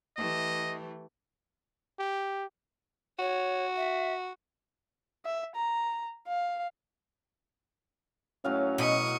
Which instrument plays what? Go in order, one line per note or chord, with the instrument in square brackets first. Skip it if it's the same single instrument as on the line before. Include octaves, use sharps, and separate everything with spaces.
[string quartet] E3 A3 G4 [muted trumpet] D#5
[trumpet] G4
[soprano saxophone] F#4 [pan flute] C#5
[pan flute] E5
[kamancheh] E5
A#5
F5
[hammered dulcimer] A2 F#3 F5 [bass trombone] C#4
[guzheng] B2 [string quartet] C#6 D#6